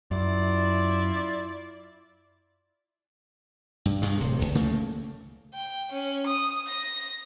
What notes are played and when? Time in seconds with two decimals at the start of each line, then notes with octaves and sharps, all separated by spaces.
0.11 F#2 E4 F4 D5
3.86 G2
4.02 G2 G#3
4.18 D1 C3
4.42 C#2
4.55 C#3 A3 A#3
5.54 G5
5.92 C#4
6.26 D#6
6.68 A#6